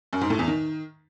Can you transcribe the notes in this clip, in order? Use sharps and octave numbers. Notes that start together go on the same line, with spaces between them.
F#2
G#2
A2
E2
D#3